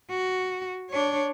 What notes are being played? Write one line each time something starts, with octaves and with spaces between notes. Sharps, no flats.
F#4
D4 C#5